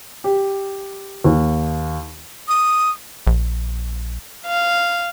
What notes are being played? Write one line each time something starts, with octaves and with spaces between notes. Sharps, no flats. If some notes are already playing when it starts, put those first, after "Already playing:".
G4
D#2
D#6
A#1
F5